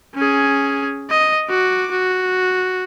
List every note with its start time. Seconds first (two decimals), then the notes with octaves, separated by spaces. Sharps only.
0.15 C#4 G#4
1.10 D#5
1.49 F#4 D6
1.91 F#4